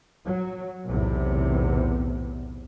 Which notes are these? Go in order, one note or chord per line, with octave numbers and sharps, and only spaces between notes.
F#3
B1 E2 A2 C3